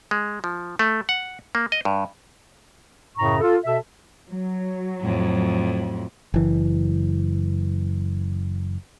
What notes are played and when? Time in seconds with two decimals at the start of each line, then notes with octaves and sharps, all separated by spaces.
0.11 G#3
0.44 F3
0.79 A3
1.09 F#5
1.55 A#3
1.72 D#5
1.85 G2
3.17 F#2 A2 C#3 A#5 C#6
3.41 F4 A4
3.65 B2 A4 E5
4.28 F#3
5.00 F2 A2
6.34 F#1 E3